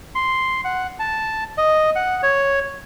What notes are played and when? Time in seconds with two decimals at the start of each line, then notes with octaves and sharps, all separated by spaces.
0.15 C6
0.65 F#5
0.99 A5
1.58 D#5
1.96 F#5
2.23 C#5